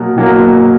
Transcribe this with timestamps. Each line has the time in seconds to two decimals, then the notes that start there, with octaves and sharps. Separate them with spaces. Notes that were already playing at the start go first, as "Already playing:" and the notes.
Already playing: B2 F#3 A#3
0.16 B2 F#3 A#3